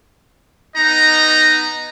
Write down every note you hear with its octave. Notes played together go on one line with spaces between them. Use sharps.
B3 D#4 D#5 A#5